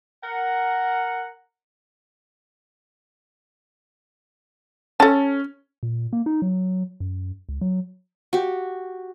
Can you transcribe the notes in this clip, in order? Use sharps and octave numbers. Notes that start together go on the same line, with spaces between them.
A#4 F#5
C#4 A4 A5
A#2
A#3
D#4
F#3
F#2
C#2
F#3
F#4 G4